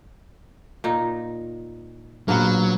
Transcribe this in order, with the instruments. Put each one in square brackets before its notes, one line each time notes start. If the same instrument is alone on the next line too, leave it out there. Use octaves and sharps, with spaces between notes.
[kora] A#2 D#4
[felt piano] A#1 [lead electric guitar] F#3 [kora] A#3 B3 F#5